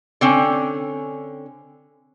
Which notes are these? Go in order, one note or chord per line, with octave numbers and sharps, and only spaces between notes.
D3 C4 C#4